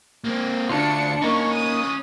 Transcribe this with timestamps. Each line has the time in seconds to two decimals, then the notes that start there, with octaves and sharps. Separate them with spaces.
0.24 A#3 C4
0.69 D2 D4 F4 C#7
1.22 A#3 C#4 D#4 B4 C#6
1.54 D#6